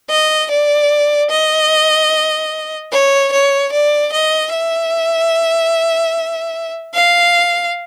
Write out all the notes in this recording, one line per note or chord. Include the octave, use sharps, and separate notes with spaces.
D#5
D5
D#5
C#5
C#5
D5
D#5
E5
F5